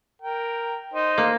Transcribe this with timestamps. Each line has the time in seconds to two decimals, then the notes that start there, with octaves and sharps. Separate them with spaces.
0.22 A#4 G5
0.94 D#4 C5 D#5
1.18 A#3